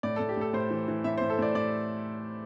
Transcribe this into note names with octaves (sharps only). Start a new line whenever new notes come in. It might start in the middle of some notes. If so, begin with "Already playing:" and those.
A2 D5
A2 A4
G4
A2 A4
A2 C5
E3
E3
A2 E5
A2 C5
A4
A2 D5
A2 D5